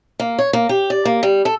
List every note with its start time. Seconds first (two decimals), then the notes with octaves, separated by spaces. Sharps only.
0.20 A#3
0.38 C#5
0.53 A#3
0.69 G4
0.90 D5
1.05 A#3
1.23 G3
1.45 A4